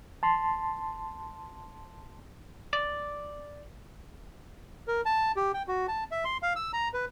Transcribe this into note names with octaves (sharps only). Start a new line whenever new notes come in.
A5 C6
D5
A#4
A5
G4
G5
F#4
A5
E5
C6
F5
E6
A#5
B4